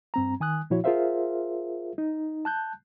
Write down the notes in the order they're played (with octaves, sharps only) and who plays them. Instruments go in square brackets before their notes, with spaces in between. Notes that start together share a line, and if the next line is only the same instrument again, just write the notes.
[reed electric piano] G2 C4 A#5
D#3 G#5 D#6 F#6
A#2 F3 E4 F#4 C#5
F4 G#4 A#4 C5 E5 F5
D#4
A5 F#6 G6